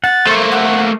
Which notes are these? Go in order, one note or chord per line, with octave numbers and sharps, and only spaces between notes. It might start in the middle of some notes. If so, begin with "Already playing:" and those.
F#5 A6
A3 A#3 C5 E5
F#5